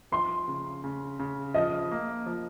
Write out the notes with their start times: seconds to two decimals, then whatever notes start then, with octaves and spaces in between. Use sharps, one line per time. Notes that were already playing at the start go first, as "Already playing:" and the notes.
0.12 F3 C6
0.48 C#3
0.84 C#3
1.19 C#3
1.54 F3 D#5
1.91 A#3
2.26 F3